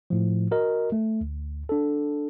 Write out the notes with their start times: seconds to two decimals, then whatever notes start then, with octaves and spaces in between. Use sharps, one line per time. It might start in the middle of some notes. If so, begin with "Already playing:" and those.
0.10 A2 F3
0.51 F#4 A#4 D#5
0.92 A3
1.21 D2
1.69 D4 A4